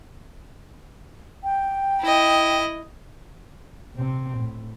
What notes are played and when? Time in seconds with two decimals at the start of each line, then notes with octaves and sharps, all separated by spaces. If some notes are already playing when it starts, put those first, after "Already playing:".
1.44 G5
2.01 E4 D#5
3.95 C3 C4
4.38 A2